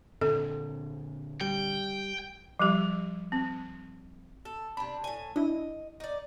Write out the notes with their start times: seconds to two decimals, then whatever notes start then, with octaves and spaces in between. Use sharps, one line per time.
0.21 A#2 D3 C4 A4
1.41 G3 G5
2.59 F3 G3 G4
3.32 C4
4.45 A4
4.77 C3 D4 B5
5.04 A2 G#5
5.36 D4 E4 D#5
6.00 D#4 D5